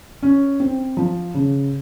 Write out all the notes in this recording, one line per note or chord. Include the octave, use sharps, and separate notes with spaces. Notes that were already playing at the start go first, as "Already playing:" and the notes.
C#4
C4
F3
C#3